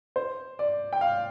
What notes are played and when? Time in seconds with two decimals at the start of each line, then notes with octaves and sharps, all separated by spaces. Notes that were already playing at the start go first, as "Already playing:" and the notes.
0.16 C5
0.59 D5
0.93 G5
1.01 F5